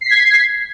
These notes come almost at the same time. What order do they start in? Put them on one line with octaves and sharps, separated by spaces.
C7 B6 G#6